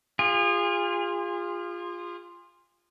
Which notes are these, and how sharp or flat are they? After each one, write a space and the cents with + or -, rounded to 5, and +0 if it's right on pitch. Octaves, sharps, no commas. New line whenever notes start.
F4 +0 G#4 -35